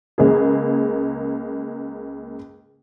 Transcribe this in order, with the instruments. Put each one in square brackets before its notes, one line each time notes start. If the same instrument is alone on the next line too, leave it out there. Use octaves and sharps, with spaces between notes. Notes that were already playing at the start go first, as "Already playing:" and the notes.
[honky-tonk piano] C#2 A#3 G#4